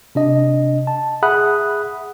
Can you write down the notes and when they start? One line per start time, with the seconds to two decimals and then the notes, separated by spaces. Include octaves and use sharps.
0.15 C3 D4 D#5
0.87 A5
1.23 G#4 E5 F#5 B5 D#6 F#6